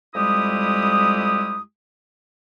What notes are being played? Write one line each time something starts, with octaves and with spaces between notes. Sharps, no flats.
F2 G3 G#3 E4 G4 D#6